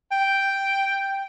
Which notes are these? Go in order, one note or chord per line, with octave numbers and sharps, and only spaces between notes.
G5